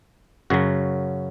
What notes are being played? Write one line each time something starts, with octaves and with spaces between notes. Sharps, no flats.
F#2 C#3 F#3 F#4